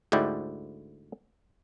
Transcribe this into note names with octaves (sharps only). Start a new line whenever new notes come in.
D2 G#2 D3 E4 D5 G5